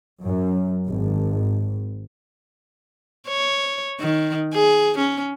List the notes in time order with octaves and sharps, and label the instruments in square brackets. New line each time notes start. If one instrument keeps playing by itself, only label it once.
[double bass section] F#2
G#1
[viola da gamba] C#5
D#3
G#4
C#4